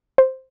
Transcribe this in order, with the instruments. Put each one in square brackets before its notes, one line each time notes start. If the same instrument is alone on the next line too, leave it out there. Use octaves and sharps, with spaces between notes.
[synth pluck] C5